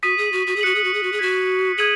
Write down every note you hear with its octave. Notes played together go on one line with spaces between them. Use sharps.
F#4 D#6 B6 D#7
G#4
F#4
F#4
G#4
F#4 F#6 C#7 F#7
G#4
F#4
G#4
F#4
G#4
F#4 G#6 B6 F#7
G#4 D#6 G#6 D#7 F#7